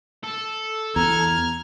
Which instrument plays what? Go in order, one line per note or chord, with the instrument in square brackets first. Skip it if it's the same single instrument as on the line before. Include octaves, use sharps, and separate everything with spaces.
[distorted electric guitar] A4
[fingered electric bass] E2 [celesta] A#5 [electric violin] F6 G#6